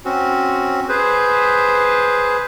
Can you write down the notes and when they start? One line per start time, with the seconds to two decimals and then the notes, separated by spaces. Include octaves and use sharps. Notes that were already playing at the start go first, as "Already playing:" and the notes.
0.05 C4 C#4 F#4
0.89 G#4 B4 C5